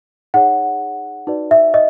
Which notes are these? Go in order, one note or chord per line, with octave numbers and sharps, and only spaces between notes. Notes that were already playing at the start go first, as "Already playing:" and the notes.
D#4 G#4 C#5 F#5
D#4 F#4 B4 D5
E5
D#5